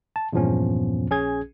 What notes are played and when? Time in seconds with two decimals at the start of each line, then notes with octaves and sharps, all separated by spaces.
0.16 A5
0.33 E2 G2 A#2 F3 B3 C#4
1.10 A#1 C#4 G#4 G#6